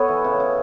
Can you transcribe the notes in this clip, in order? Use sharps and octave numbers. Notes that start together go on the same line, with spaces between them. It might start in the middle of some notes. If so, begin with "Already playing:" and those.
Already playing: B3 A4 B4 C#5
E3
C#3
C#3